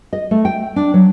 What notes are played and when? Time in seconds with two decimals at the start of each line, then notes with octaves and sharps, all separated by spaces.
0.13 D#5
0.31 A3
0.45 G5
0.76 D4
0.94 F#3